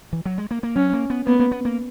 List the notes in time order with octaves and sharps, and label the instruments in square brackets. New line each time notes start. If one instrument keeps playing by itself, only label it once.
[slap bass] E3
F#3
G#3
A#3
A#3
[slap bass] F#3 [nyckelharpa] C#4
[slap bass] A#3
B3
[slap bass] A#3 [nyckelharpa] B3
[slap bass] A#3
B3
A#3